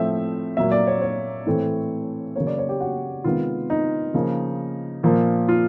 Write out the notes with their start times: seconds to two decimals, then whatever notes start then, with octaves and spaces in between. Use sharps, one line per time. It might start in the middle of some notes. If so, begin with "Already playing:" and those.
Already playing: A2 F3 A3 C4 E5
0.57 A#2 F#3 A#3 E5
0.72 D5
0.87 C#5
1.02 C#5
1.46 A2 E3 A3 C4
2.36 C#3 F#3 A#3 C#5
2.47 D5
2.58 C#5
2.69 G4
2.80 F#4
3.24 C3 D#3 G#3 B3 F4
3.70 D#4
4.14 C#3 F3 A#3
5.03 A#2 F3 A#3
5.49 F4